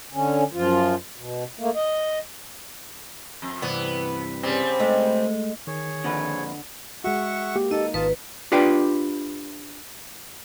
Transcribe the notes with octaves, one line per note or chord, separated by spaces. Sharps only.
D3 C#4
F#2 F3 F4
B2
A3 A#3
D#5
F2
G2 C3 E3 B3
C#3 G3 C4
G#3 A3 D#4
D#3 G#4 C#5
F2 A#2 D3 B4
G#3 F#4 E5 F#5 C#6
A#3 G4
D#4 A4 D#5
G#1 F4 B4 A5 D#6
D4 F4 G4 B4 G5